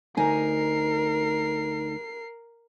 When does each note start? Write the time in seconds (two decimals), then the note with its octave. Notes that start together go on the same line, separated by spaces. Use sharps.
0.17 D2 D#4 A#4 G#5 C7